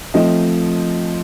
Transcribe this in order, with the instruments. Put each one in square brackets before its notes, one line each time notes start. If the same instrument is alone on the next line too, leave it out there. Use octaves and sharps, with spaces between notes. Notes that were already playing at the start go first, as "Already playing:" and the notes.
[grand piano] F3 A3 C4 D#5